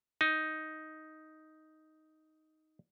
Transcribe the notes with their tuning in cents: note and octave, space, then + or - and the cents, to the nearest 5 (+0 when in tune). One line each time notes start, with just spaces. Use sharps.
D#4 +5